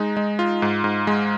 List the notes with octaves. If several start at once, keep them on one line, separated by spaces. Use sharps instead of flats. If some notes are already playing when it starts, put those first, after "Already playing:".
Already playing: G#3 D#4
G#3
F4
G#2
G#2
G#3